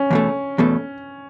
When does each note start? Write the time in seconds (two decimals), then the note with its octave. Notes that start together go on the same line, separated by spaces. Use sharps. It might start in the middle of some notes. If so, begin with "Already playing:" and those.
Already playing: C#4
0.11 E2 B2 A3
0.58 E2 B2 A3